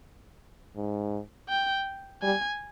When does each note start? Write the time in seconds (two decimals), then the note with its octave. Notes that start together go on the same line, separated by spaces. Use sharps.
0.76 G#2
1.49 G5
2.22 G3 G#5